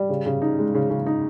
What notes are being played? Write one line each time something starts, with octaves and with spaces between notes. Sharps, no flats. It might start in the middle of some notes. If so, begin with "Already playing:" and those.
Already playing: G3
C#3
C#3
D#4
G#3
C#3
C#3
D#4